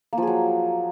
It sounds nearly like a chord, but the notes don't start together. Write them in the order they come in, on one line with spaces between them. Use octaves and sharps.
A#3 F3 G#4 F#3